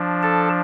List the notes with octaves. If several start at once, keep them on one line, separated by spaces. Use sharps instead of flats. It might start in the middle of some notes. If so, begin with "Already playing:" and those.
Already playing: F3 D4
A4 A5